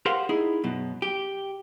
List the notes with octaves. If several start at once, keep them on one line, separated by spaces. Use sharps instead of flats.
G4 A#4 C5 F5 F#5
D#4 E4 G#4
F#2 B2
G4